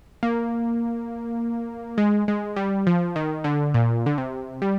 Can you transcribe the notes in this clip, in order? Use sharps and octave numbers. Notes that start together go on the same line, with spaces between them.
A#3
G#3
G#3
G3
F3
D#3
D3
A#2
D3
C3
G3